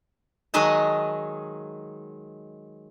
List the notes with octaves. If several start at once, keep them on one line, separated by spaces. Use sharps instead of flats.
D#3 F#3 G#3 D#5 G#5 A5